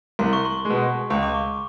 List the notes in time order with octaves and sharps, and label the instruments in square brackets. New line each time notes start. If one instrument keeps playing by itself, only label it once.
[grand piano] C2 [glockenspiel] C6
[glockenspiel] C#6
C6
[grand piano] G#3
B2
[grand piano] C#2 [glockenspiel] C#6
[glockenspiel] D6
C#6